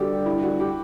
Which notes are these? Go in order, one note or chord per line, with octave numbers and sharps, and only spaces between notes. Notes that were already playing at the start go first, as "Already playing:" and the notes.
Already playing: G2 D3 G3 F#4 G4 A4
E4
F#4
G4